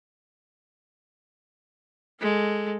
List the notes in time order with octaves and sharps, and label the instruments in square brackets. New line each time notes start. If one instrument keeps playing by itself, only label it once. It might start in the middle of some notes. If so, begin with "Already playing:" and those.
[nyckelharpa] G#3 A4